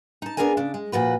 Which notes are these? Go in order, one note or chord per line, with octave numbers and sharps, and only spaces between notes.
D#4 A5
B3 D4 G#4 A#4 B4 G#5
C#3 D4
G#3
A#2 F3 F#4 B4